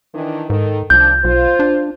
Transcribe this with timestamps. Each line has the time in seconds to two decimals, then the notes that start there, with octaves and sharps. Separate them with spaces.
0.15 D#3 E3 D4
0.50 G#2 D#3 A4 A#4
0.90 C2 F3 D4 F4 G6
1.24 B1 F4 C5
1.59 D4